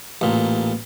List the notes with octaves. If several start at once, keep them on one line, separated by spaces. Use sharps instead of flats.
A1 A#2